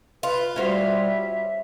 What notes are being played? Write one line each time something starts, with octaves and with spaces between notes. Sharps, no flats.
F4 B4
G3 C#4 F#4 C5 E5